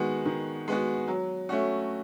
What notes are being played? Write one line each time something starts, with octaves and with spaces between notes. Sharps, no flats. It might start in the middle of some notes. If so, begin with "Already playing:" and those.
Already playing: D#3 G#3 B3 F#4
D#3
G#3 B3 F#4
F#3
A3 C#4 F#4